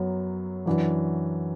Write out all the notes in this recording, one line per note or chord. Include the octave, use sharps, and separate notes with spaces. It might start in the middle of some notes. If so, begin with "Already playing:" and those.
Already playing: F#2 F#3 B3
F#2 E3 D4 F#4